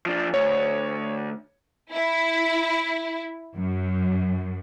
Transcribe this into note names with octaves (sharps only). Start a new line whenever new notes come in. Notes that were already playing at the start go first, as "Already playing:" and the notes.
F3 D4
D2 C#5
E4
F#2